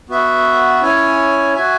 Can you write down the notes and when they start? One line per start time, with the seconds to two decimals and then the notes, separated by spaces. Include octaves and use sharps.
0.09 B3 F#4 E5
0.82 C#4 E4 C#5 G#5
1.53 F#4 E5 G#5